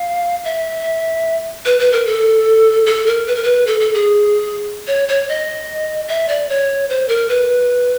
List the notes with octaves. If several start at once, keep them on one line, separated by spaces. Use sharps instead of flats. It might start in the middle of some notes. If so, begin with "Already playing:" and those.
Already playing: F5
E5
B4
B4
A#4
A4
A4
A#4
B4
A#4
B4
A4
A4
G#4
C#5
C#5
D#5
E5
D5
C#5
C5
A#4
B4